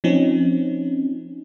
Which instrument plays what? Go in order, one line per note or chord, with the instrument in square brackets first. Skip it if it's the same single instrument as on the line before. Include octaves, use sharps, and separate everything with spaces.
[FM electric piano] F3 C4 C#4 D#4